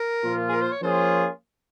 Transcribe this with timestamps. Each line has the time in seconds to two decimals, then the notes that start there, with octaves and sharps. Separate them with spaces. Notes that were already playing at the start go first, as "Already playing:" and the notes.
Already playing: A#4
0.23 A#2 F3 A#3 F4
0.49 G#4
0.52 A#4
0.62 C5
0.72 C#5
0.82 F3 A#3 C#4 F4 G#4 C5